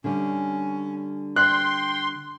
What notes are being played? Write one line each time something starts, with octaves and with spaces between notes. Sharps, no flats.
D3 G3 C#4
G5 C6 F#6